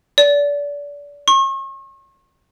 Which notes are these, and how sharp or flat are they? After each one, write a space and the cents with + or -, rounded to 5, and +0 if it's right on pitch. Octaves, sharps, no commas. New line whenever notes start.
D5 -30
C#6 -40